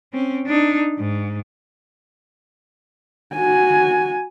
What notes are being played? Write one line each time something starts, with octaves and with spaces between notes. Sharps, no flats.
C4 C#4
D4 D#4
G#2
F#4 G#5